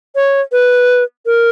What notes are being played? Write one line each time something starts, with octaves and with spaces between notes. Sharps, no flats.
C#5
B4
A#4